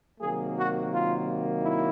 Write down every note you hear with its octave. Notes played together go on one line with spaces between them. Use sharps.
C3 D#3 F#3 A#3 G#4
F#4
F4
E4